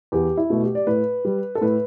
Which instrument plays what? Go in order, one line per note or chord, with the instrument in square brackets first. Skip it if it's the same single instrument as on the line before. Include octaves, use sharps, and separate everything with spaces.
[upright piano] E2 G4
E4
B2 A3
G4
D5
A2 B4
G3
A4
A2 B4